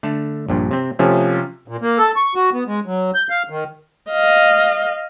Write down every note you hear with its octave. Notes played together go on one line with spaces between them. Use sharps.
D3 A3 A5
A#1 G2 A#2
C3 C4
C3 F3 A3 C#4
A#2
A#3
A4
C#6
F#4
B3
G#3
F#3
G6
F5
D#3
D#5 F5